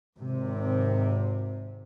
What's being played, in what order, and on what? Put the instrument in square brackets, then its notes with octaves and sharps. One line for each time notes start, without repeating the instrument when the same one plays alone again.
[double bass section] G#1 C3